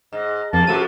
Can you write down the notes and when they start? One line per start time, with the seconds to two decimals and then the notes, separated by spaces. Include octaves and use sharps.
0.13 G#2 D#5
0.53 F2 C3 A#3 A5
0.67 F#2 C3 F3 A3 F#4 E6 D#7